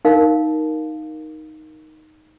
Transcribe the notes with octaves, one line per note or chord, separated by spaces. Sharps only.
D#4 A#4 F5